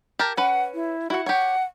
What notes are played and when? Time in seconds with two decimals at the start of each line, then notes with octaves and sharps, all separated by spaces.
0.19 G4 A#4 A5
0.37 C#4 B4 F#5
0.74 E4
1.10 E4 F#4 F#5
1.26 G4 C#5 F#5